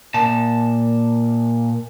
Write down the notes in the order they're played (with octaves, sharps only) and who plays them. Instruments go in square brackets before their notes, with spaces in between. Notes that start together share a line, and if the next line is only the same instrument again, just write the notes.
[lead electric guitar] A#2 A5